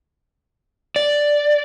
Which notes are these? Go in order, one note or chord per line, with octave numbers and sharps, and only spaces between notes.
D5